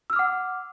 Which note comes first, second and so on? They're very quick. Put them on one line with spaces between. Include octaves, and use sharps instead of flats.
E6 F6 D6 F#5